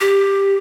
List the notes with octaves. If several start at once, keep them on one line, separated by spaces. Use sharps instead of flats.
G4